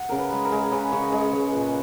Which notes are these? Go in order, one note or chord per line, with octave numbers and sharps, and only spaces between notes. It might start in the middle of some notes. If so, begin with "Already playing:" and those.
Already playing: F#5
C#3 A#4
B4
G#3
A#4
G#3
C#3 B4
C#3 C#5
D#5
G#3 C#5
G#3 C#5
A#2 B4